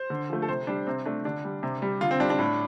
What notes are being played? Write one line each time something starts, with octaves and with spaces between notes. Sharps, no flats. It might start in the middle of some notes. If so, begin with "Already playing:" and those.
Already playing: C5
D3
F3 A3
A4
C3 C5
G3 D4
C3 C4
A3 D4
D3 D4
G3
C3
G3
D3 F4
C4
G3 D4
D4
A2